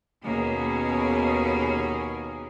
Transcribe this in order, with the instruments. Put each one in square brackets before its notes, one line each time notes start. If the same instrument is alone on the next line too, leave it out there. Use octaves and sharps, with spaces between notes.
[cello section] D#2 B2 A#3 C#4 G#4